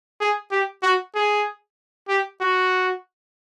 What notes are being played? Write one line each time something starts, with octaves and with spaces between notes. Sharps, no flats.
G#4
G4
F#4
G#4
G4
F#4